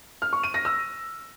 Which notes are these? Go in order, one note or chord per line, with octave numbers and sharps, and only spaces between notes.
F6
C#6
D#7
A#6
E6